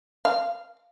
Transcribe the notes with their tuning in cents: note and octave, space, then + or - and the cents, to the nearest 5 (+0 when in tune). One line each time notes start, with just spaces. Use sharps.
F5 -10